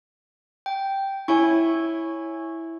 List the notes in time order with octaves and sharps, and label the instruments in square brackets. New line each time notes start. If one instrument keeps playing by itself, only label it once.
[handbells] G5
[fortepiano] E4 [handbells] C#5 G#5 C#6